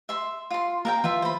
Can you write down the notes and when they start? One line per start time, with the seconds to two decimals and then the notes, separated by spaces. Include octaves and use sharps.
0.09 E5 C6
0.51 F4 C6
0.85 A#3 A#4 F5 G5
1.04 E3 F4 E5
1.22 C5 B5